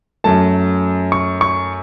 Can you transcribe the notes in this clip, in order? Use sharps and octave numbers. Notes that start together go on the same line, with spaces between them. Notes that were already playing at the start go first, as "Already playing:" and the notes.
F#2 F#3 A3 A5
C#6
C#6